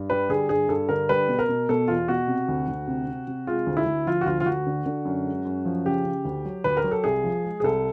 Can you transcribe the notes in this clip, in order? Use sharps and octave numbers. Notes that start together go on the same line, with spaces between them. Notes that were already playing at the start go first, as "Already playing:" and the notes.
Already playing: G2
G3 B4
D3 G#4
G2 G#4
G2 A4
D3 A#4
G3 B4
B2
A#4
B2
B2 A4
E2 F4
B2 F#4
C3
D2
D2
C3
C3
C3
G#3 F4
D2
E4
D2
F3 F4
F#4
D2 F4
F4
D2 F#4
D3
D3
F#2
G#3
F#2
F3
C#3 G4
C#3
D2
F#3
D2 B4
A#4
F#3
A4
C2 G#4
F3
G#3
G#4
C2 A4